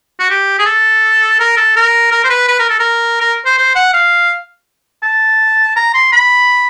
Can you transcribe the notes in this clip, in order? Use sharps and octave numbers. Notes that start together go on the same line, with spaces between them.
F#4
G4
G#4
A4
A#4
A4
A#4
A#4
C5
B4
B4
A#4
A4
A#4
A#4
C5
C5
F#5
F5
A5
A#5
C6
B5